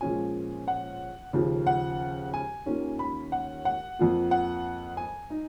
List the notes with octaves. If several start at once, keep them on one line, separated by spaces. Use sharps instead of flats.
A#2 F3 G#3 C#4 F4 G#5
F#5
D#2 C#3 F3
F#5
G#5
D#2 D#3 A#3 C#4 F4
B5
F#5
F#5
F2 F3 A#3 F4
F#5
G#5
D#4